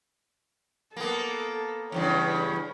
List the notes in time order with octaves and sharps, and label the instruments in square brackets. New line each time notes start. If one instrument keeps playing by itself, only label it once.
[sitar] A#3 B3 [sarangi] A4
[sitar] E2 G2 C#3 [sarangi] C#5